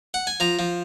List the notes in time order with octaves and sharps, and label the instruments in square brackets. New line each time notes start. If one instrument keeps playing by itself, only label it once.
[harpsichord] F#5
G#5
F3 A#5
F3